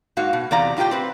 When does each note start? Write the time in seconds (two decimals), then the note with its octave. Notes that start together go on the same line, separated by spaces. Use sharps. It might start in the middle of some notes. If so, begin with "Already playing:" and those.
0.17 G#2 A#3 F#4 F5
0.33 B2
0.51 E2 C3 D5 F5 A#5
0.77 A2 F4 G4 D5 G5
0.91 C4 B4 C5